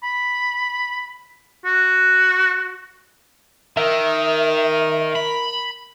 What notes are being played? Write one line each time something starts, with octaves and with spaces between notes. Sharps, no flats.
B5
F#4
D#3 A#4 E5
B5